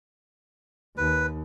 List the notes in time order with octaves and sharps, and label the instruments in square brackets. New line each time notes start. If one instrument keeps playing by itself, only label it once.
[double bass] D#2 [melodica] B4